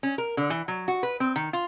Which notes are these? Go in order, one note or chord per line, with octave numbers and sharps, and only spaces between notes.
C#4
A#4
D3
E3
F#3
F#4
B4
C4
D#3
F4